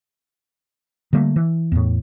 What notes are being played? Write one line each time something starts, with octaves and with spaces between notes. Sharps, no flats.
D3 G3 A3 A#3
E3
E2 A2